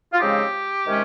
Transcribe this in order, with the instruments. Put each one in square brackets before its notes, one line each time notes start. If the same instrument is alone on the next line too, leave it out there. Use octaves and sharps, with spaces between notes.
[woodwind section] F4
C#3 F3 G#3 C4 D#4 G4
C3 D#3 G#3 C#4